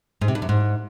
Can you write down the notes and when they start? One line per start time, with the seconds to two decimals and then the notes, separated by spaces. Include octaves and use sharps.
0.21 G#2
0.28 C3
0.35 G2
0.42 F#2
0.49 G#2